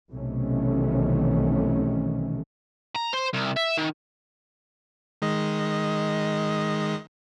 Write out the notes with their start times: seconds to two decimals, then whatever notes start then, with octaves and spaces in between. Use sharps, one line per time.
0.12 B1 C3 D#3 E3 A3 C#4
2.95 A#5
3.13 C5
3.33 C2
3.56 E5
3.77 D#3
5.22 D#3 G#3 D#5